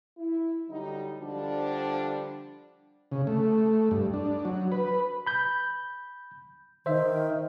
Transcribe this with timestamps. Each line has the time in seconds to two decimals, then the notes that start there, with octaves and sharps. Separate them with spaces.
0.18 E4
0.69 D3 F#3 G3 D#4
1.19 D3 F3 G3 D4
3.12 C#3
3.27 A3
3.91 G2
4.14 D4
4.45 F#3
4.72 B4
5.27 B5 G6
6.86 D#3 C5 E5